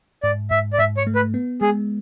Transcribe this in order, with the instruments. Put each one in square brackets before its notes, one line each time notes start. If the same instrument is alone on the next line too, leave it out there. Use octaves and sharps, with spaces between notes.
[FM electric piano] G#2 [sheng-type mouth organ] D5
[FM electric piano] G#2 [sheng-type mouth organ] E5
[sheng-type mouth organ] D5
[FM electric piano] G#2 [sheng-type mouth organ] E5
[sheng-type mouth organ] C#5
[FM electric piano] A3
[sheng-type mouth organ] B4
[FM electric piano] B3
[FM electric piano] G#3 [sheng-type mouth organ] G#4